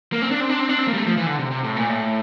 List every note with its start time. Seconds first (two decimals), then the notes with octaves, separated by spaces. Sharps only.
0.12 A#3
0.22 C4
0.31 D4
0.41 C4
0.49 D4
0.60 C4
0.69 D4
0.79 C4
0.88 A#3
0.94 G3
0.98 A3
1.07 F3
1.17 E3
1.27 D3
1.39 C3
1.51 C3
1.64 A2
1.76 A#2
1.89 A2